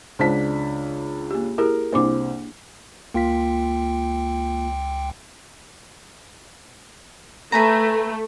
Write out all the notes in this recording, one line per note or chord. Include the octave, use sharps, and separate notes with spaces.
C#2 G#3 D4 C5 A5 B6
A#3 G4
E4 G4 G#4 A#4
C2 A#3 D4 C5 D6
C#2 A#3 F4 G5 B6
A3 B4 G#5 A#5